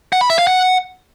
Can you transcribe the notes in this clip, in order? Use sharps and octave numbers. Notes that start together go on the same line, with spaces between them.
F#5
B5
E5
F5
F#5